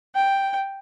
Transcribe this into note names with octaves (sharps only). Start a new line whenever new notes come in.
G5